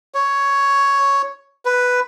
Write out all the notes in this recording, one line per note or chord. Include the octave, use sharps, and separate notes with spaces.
C#5
B4